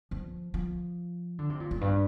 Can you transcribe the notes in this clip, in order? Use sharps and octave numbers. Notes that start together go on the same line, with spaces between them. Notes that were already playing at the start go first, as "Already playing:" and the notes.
F3
F3
D3
C3
A#2
F2
G2